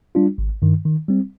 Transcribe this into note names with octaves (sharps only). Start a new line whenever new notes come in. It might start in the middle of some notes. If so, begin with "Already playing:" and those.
G3 D4 F4
G#1
G2 D#3
D#3
G3 C4